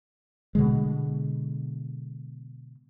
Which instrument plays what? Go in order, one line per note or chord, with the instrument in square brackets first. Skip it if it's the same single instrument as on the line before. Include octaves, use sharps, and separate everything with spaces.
[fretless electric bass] B2 D3 G#3